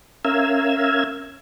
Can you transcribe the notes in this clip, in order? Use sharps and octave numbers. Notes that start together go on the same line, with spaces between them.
C#4 A#4 E5 F5 E6 G#6